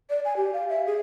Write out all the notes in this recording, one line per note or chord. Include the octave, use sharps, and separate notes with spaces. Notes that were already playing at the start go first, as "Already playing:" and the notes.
D5
G#5
G4
F5
E5
G#4